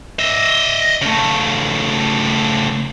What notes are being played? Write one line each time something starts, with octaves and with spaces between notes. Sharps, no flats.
D#5 E5
C#3 A3